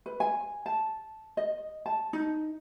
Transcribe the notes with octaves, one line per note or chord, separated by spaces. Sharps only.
B4
G#5
A5
D#5
A5
D#4